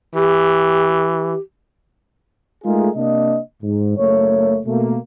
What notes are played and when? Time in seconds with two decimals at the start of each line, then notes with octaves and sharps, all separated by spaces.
0.15 E3 G4
2.64 G#3 A3 D#4 F4 G#4 A#4
2.96 C3 A#3 D4 D#5
3.63 G#2
3.97 F#1 A3 A#3 C#5
4.66 B2 A3 A#3